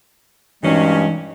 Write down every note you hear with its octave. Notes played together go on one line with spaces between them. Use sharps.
G2 A#2 E3 F#3 G#3 C#4 D#4